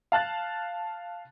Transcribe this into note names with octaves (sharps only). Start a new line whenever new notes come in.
F5 A5 F#6 A6